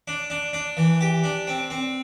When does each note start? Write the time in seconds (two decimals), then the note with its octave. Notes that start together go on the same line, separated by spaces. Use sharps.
0.08 D4
0.30 D4
0.53 D4
0.77 E3
1.01 G4
1.24 D4
1.47 C4
1.70 C4